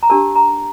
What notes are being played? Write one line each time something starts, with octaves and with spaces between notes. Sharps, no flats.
A#5
D4 G4 A#4 A5
A#5